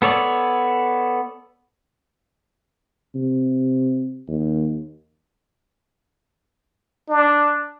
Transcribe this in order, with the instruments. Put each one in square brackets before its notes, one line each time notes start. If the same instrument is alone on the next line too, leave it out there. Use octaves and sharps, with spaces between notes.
[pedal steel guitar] B3 A4 C#5 D5
[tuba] C3
D#2
[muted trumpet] D4